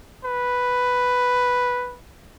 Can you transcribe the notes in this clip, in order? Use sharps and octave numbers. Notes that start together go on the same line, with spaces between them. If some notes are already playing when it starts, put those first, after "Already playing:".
B4